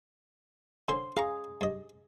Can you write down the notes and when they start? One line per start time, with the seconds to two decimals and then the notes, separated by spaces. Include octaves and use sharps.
0.88 D3 C#4 C5 C6
1.17 G#4 F5 A#5 C#6
1.61 G2 D#5